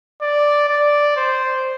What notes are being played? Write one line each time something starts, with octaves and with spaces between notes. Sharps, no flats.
D5
D5
C5